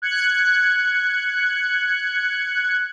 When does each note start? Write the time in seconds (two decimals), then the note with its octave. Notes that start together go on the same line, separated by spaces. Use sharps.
0.02 F#6 G#6 C#7